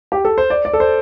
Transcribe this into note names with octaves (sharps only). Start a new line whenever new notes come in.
G4
A4
C5
D5
D5
A4
C5